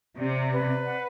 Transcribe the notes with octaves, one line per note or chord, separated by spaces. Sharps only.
C3 D5
B4
F#5